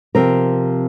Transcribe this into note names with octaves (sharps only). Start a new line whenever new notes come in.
C3 F3 C4 A#4